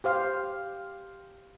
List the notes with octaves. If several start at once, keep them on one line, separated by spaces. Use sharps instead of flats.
G4 C5 F5